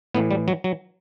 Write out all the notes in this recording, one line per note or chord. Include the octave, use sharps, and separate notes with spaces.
A2 E3 B3
G3
F#3
F#3